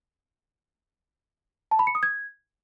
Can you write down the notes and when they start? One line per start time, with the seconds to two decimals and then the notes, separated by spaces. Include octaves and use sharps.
1.71 A5
1.79 B5
1.87 C#7
1.95 D#6
2.03 G#6